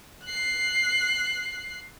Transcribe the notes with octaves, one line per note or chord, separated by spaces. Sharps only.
F#6 C7